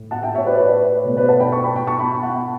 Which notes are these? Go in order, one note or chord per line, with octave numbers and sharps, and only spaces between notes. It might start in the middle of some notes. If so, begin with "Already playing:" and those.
Already playing: A2
F#5 A5
E5 G5
C#5 E5
B4 D5
B4 D5
C#5
B2 A3 C#5
B4 D5
F#5 A5
G5 B5
A5 C#6
G5 B5
G5 B5
A5 C#6
G5 B5
F#5 A5